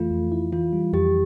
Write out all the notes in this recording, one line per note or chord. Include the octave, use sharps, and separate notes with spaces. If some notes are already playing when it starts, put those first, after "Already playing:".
Already playing: F2 E3 A3 F4
F2
E4
E3 F4
G3
F2 G4